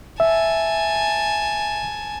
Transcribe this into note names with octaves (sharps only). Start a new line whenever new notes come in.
E5 G#5 A5